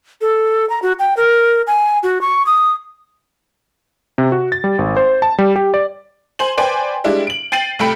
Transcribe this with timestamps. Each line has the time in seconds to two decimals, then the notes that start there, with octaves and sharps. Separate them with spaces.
0.21 A4
0.70 A#5
0.82 F#4
0.99 G5
1.17 A#4
1.67 G#5
2.03 F#4
2.21 C#6
2.46 D#6
4.18 C3
4.32 F#4
4.52 A6
4.64 G3
4.78 G#1
4.96 C5
5.22 A5
5.38 G3
5.56 G4
5.74 D5
6.39 C5 G#5 F#7
6.57 B4 C5 D5 G5 G#5
7.04 G3 G#3 D4 E4
7.27 D7 F#7
7.52 G5 A6 C7 D#7 F#7
7.79 C2 A3 G5 B5 C#7 D7